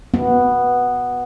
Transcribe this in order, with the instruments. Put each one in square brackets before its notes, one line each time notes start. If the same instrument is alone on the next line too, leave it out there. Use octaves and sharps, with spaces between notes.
[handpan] B3